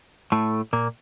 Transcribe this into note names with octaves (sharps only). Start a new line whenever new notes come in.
A2 A3
A#2 A#3